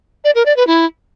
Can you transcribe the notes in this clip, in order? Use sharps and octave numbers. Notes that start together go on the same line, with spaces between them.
D5
A#4
D5
B4
E4